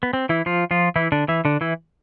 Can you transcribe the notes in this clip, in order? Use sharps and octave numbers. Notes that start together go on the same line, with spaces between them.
B3
C4
E3 E4
F3 F4
F3 F4
E3 E4
D3 D4
E3 E4
D3 D4
E3 E4